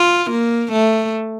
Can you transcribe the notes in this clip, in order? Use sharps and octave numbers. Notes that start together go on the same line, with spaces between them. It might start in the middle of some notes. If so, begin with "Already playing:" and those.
Already playing: F4
A#3
A3